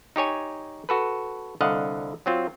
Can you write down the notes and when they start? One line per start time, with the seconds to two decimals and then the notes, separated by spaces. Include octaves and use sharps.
0.16 D#4 G4 C#5 G#5
0.89 F#4 A4 B4
1.61 C2 D3 D#5 F5 F#5
2.26 F#3 C4 F4